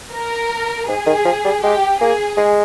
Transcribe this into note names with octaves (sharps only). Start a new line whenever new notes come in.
A#4
G#2 G#4
D#3
F3
G3
G#3 G4
A#3 G#4
G#3